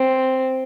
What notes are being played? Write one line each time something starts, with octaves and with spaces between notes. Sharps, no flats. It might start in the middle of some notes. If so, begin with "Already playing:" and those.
Already playing: C4